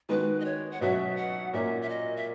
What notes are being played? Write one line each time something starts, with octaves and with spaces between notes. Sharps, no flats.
D#3 G#3 B3 F#4 B4
D#5
C#5
F#5
B2 F#3 C#4 F#4 E5
F#5
A#2 A#3 C#4 F#4 E5
E5
D#5
E5